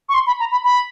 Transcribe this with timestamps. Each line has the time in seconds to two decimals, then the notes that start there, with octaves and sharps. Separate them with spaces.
0.09 C#6
0.14 C6
0.27 B5
0.40 A#5
0.51 B5
0.64 B5